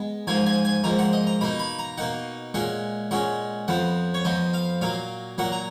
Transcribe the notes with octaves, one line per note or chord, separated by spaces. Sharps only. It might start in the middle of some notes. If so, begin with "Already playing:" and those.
Already playing: G#3 B3
G#2 F3 A#3 G#5
G#5
G#5
G#2 F3 A#3 A#5
F#5
D#5
A#5
B2 A#3 D#4 B5
B5
A#5
B2 A#3 D#4 F#5
A#2 G#3 C#4 F#5
A#2 G#3 C#4 F#5
F2 F3 B3 F#5
C#5
F2 F3 B3 D#5
F5
A#2 F#3 A#3 F5
A#2 F#3 A#3 F#5
A#5